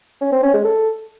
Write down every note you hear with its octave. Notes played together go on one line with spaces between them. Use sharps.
C#4
C4
C#4
G#3
A4